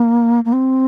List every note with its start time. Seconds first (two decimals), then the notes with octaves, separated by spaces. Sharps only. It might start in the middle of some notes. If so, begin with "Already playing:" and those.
Already playing: A#3
0.45 A#3
0.52 C4